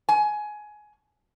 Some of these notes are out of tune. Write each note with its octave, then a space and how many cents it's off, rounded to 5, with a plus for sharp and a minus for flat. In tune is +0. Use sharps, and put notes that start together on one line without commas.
G#5 +15